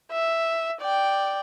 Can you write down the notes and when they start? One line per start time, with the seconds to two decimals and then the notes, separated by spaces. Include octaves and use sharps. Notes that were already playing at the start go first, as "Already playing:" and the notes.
0.12 E5
0.81 D5 G5